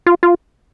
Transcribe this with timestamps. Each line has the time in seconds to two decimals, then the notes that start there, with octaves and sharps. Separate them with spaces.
0.07 F4
0.23 F4